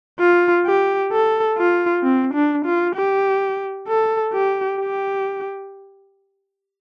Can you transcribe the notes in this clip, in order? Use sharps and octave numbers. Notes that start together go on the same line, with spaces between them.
F4
G4
A4
F4
C4
D4
F4
G4
A4
G4
G4